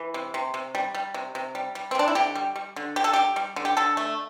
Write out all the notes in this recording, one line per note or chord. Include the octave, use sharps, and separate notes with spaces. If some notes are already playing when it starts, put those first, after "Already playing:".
Already playing: E3
C3
C3
C3
G3
G3
C3
C3
G3
G3
C4
C3 D4
E4
D3 G4
G3
G3
D3
D3 G4
A4
G3 G4
G3
D3
G4
D3 A4
A3